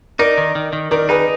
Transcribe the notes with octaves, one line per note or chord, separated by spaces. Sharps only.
D#4 A#4 D5
D#3
D#3
D#3
D#3 A#4 D5
D#4 G#4 B4